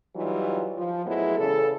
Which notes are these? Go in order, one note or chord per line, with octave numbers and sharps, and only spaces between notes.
E3 F#3 G3 D#4 F4
F3
A2 F#3 G#3 B3 E4
E2 C#3 A4